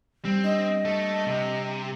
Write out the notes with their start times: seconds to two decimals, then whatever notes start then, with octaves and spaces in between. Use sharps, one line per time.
0.25 G3 C4
0.44 D4 D#5
0.85 A3 A4
1.27 C3